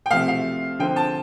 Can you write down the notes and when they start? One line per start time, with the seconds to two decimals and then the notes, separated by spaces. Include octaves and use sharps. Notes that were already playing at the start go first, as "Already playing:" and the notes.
0.06 G5
0.10 C3 F3 A3 F5
0.28 F5
0.79 D3 F3 C4 G5
0.96 A5